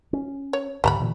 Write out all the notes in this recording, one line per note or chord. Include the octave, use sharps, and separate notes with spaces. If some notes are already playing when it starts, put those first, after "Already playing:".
C#4
C#5
D2 G#2 D3 G3 A#5 B5
A#2 D3 E3